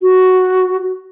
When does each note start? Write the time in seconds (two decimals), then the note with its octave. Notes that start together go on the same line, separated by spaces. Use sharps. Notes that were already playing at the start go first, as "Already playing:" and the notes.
0.02 F#4